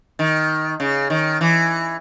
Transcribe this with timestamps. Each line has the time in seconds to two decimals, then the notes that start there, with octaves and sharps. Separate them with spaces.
0.19 D#3
0.80 C#3
1.10 D#3
1.41 E3